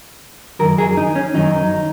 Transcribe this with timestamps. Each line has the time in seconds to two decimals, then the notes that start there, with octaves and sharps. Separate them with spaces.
0.59 F#2 D#3 F#3 A#4
0.78 G#4
0.97 D#4
1.15 C#4
1.34 F#2 D#3 F#3 D#4